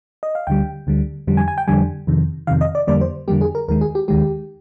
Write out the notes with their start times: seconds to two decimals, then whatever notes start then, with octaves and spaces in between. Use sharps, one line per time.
0.23 D#5
0.35 F5
0.47 D2 D3 G3 G5
0.87 D2 D3 G3
1.27 F2 D3 G3
1.37 G#5
1.48 G#5
1.58 G5
1.68 F2 D3 G3 G#5
2.07 F2 C3 D#3
2.47 F2 C3 D#3 F5
2.61 D#5
2.75 D5
2.87 F2 D3 G3 A#3 D5
3.01 C5
3.28 F2 D3 G3 A#3 G4
3.41 G#4
3.55 A#4
3.68 D#2 D#3 G#3 A#4
3.81 G#4
3.95 G4
4.08 D#2 D#3 G#3 G4